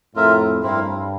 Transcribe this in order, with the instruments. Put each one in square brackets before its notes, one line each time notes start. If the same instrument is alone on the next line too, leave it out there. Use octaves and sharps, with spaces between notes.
[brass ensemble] F2 A2 [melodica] F4 A#4 E5
[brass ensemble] G2 [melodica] C4 E4 A#4 F5